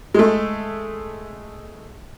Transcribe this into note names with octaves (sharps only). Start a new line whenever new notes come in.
G#3 A3